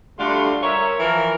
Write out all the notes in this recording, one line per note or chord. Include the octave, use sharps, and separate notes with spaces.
D3 G3 A3 F4 F#4 C6
A#4 C#5 E5
E3 F3 E4 A#4